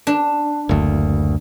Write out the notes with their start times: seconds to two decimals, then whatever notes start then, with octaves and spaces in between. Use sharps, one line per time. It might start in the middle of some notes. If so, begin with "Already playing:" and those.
0.07 D4
0.69 F#1 D2